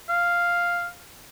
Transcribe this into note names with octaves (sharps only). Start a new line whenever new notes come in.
F5